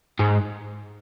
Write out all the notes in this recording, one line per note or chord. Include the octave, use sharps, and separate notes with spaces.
G#2